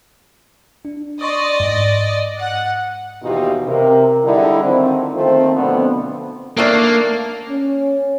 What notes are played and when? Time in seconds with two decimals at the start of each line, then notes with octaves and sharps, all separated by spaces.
0.85 D4
1.21 D5 D#5 C6 C#6 D#6
1.60 G#2
2.40 F#5
3.23 D#2 B2 E3 D#4 F4 G4
3.67 C3 A#4
4.25 D3 G3 G#3 D#4 E4
4.63 D3 D#3 F3 C4
5.14 D#3 F3 A3 A#3 C4
5.56 B2 D3 F3 A3 B3 C4
6.57 D#3 A3 A#3 D4
7.49 C#4